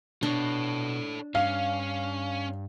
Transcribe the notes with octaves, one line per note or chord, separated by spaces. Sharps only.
B2 D4 A4 C#5
G2 C#4 F5